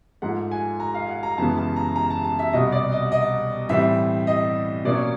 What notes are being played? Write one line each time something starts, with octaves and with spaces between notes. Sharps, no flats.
G#2 F3 A3 F#5
G#5
A#5
F5
F#5
A#5
F#2 C#3 E3 G#3 B3 A5
A5
A#5
A#5
A5
A5
E5
C2 B2 G3 D#5
D5
D#5
D#5
A2 E3 G3 C4 E5
D#5
B2 F#3 A#3 C#4 D5